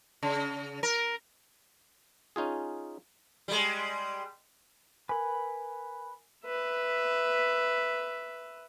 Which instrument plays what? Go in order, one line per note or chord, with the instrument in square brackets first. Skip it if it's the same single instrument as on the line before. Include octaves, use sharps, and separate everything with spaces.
[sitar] C#3
A#4
[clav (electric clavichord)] C#4 D#4 F4 G#4
[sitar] G3 G#3
[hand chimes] A#4 G#5 [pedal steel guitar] B4 B5
[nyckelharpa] B4 E5